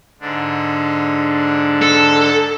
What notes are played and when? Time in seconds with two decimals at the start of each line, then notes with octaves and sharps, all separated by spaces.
0.21 G#2 D3 D4
1.82 A4